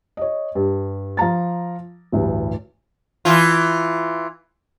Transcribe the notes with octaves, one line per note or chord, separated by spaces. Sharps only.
C#5 D#5
G2
F3 F5 A#5 A6
A1 D2 G2
E3 F4